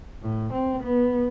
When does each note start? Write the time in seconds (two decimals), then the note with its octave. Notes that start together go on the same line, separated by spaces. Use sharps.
0.22 A2
0.54 C4
0.84 B3